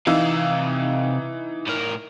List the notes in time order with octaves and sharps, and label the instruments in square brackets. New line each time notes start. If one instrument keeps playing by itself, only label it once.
[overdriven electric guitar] C3 F5 [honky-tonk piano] E3 D#4 E6
[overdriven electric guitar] A2 A#4